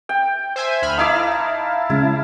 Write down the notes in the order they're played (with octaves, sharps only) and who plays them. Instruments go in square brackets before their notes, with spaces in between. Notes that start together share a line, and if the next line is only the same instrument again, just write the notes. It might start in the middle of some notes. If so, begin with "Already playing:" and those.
[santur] G5
[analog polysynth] C5 E5 G#5
D2 B5 F6
[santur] D#4 E4 D6 [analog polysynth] F5 A5
[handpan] C#3 G#3 C#4 [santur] E4